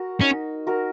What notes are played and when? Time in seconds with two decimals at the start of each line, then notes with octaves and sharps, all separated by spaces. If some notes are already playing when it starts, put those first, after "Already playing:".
Already playing: F#4 A#4
0.21 C#4 D#4
0.67 F#4 A#4